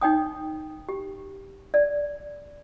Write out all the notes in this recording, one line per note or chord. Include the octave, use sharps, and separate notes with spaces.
D#4 C#5 G5 D#6
G4
D5